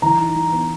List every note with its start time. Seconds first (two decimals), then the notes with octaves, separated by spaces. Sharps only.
0.02 E3 A#5
0.19 D#4
0.36 E3
0.52 B3